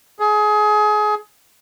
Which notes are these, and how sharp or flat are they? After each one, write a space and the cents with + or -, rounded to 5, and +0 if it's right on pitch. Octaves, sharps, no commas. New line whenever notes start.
G#4 +25